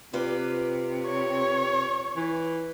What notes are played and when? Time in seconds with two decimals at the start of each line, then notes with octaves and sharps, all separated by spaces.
0.13 C3 F4 B4 D5
1.06 C#5
2.16 E3